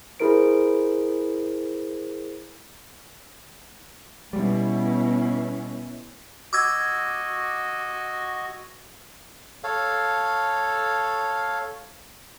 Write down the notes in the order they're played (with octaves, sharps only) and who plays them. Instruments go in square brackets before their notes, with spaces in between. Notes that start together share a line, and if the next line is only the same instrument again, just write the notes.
[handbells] E4 G#4 A#4 C5 D7
[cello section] B2 [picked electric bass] G3 [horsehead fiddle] C#4 E4
[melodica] F#4 D#5 [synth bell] D6 E6 G#6
[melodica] A4 C#5 F5